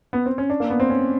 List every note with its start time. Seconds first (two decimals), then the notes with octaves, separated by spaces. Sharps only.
0.13 B3
0.26 C4
0.38 C#4
0.50 D4
0.60 A#3
0.70 B3
0.80 C4
0.90 C#4